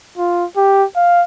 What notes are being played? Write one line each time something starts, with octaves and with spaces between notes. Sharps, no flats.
F4
G4
F5